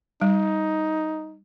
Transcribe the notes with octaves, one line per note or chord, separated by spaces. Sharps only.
G3 D#4